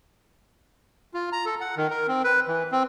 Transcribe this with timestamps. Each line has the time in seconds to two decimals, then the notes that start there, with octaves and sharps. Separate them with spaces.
1.14 F4
1.32 A#5
1.46 A4
1.61 F#5
1.77 D#3
1.90 A#4
2.08 C4
2.24 B4
2.48 E3
2.72 C4